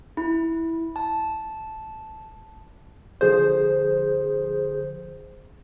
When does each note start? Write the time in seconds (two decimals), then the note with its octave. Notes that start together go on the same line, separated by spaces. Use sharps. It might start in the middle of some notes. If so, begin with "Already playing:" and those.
0.17 E4
0.96 A5
3.21 D3 F3 G#4 C5